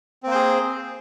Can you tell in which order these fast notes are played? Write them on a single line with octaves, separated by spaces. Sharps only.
C4 A#3 C5 G#4